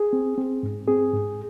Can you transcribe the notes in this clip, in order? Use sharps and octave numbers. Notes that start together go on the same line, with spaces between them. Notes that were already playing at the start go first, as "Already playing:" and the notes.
Already playing: G#4
C4
C4
G#2
C4 G#4
G#2